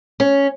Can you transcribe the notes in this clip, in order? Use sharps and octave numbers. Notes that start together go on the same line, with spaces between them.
C#4